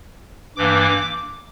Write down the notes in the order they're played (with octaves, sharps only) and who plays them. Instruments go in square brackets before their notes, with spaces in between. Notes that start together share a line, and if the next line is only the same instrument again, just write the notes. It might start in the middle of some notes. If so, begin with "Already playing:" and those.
[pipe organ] G2 E3 A#3 D6